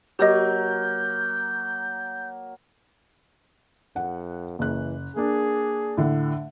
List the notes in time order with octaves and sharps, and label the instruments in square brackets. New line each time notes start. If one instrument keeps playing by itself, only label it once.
[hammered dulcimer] F#3 A#3 [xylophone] G4 D#5 [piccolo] G6
[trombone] F2 [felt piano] F#5
[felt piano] F#1 F#6 [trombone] E3
[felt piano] A#3 D4 [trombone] G#4
[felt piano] A2 D3